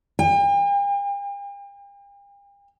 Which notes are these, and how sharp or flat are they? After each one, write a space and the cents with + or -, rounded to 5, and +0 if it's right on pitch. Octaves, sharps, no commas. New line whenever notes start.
G5 +45